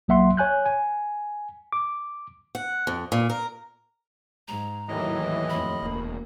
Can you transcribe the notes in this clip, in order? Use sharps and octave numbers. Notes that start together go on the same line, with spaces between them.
B1 F#3 A#3 E5 F#5 C6
C#5 G#5 F#6 G6
G#5
D6
F#5
F2
A#2
A#4
G#2 A#5
D#2 A2 D#3 E3 F#3 D#5
F2 A3 B5
E1 D2 A#3